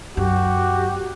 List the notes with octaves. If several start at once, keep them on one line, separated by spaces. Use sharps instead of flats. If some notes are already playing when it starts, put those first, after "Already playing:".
F#2 F#4 G4